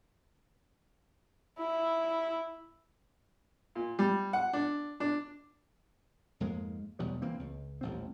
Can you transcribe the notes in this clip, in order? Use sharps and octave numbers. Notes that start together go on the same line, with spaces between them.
E4
A#2
G3
F#5
D4
D4
F2 G#2 G#3 A#3
B1 E2 F#3 G3
B1 E3 A#3 C4
C#2
D#1 A1 C4